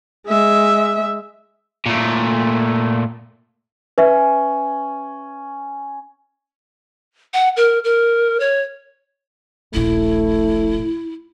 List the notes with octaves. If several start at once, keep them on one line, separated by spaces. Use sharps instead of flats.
G#3 E5
A#2 A3
C#4 B4 E5
F#5
A#4
A#4
C#5
D#1 A#1 A3 E4